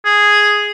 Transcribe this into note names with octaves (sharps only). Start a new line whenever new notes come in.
G#4